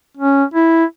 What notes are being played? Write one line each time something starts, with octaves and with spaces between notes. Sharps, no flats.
C#4
E4